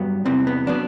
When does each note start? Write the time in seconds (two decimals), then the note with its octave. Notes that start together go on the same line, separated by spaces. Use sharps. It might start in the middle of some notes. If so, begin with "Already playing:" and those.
Already playing: G2 F#3 B3
0.25 E2 C3 E3 C4
0.47 B3
0.67 F#3 B3 D4